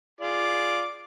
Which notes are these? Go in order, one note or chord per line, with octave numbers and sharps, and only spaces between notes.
F4 G#4 D5 D6